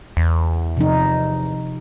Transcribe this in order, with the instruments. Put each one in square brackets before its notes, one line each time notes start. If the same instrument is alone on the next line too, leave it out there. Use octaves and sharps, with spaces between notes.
[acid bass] E2
[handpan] C3 F3 D#4